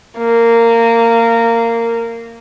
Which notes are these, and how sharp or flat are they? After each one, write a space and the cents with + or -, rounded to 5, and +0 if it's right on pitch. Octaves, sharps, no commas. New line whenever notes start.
A#3 -15